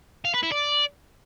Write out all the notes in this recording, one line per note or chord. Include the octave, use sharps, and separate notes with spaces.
F5
B4
E4
D5